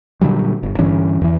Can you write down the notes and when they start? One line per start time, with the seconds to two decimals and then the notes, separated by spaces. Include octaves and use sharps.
0.21 A#2 D3 F#3 G3
0.63 G1
0.79 G2 D3 E3 C#4
1.21 E2 E3